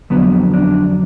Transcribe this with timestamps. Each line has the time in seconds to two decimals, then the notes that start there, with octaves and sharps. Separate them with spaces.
0.10 F2 D3 F#3 B3
0.54 D4